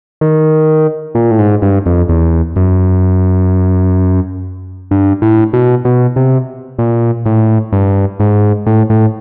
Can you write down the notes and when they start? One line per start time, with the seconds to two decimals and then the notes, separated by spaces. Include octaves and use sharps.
0.21 D#3
1.15 A#2
1.31 A2
1.39 G#2
1.62 G2
1.86 F2
2.09 E2
2.56 F#2
4.91 G2
5.22 A2
5.53 B2
5.85 B2
6.16 C3
6.78 A#2
7.26 A2
7.73 G2
8.20 G#2
8.67 A2
8.90 A2